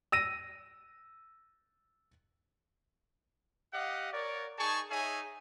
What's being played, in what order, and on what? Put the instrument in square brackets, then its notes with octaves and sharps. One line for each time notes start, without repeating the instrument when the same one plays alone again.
[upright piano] E6 A#6 D#7
[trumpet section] G4 D#5 F5 F#5
A#4 C#5 D5
D#4 G#4 G#5 A5 C#6
D#4 G#4 C#5 E5 G#5